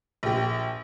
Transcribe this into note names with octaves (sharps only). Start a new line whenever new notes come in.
A#1 G4